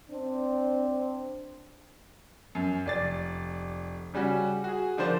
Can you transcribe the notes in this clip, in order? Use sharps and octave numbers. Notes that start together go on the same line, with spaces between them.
C4 D4
F#2
F1 D5 A6
C#3 G3 C#4 F#4
F#4 G#4
D3 F3 D4 A#4 C5